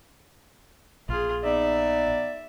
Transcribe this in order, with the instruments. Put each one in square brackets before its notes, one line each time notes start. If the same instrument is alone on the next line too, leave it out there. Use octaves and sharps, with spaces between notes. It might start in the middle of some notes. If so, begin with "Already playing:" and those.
[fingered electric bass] A#1 [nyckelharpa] F4 G#4
[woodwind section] B3 D#4 D5 [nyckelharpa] E5